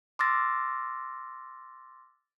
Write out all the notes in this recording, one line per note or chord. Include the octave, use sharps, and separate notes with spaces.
C6 D6 E6 F6 A6 A#6